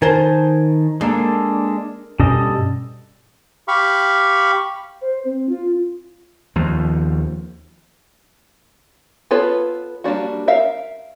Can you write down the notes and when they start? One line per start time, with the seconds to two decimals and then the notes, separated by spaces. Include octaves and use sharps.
0.02 D#3 A#4 C5 G#5 A5
1.01 G#3 A#3 D4 A4
2.20 G2 B2 G3 C#4 A4 D#5
3.68 G4 F5 B5 C#6
5.02 C5
5.25 C4
5.49 F4
6.56 D#2 F3
9.31 B3 F4 A4 B4 C#5
10.04 G3 A#3 D4 F#4
10.48 A#4 E5 F5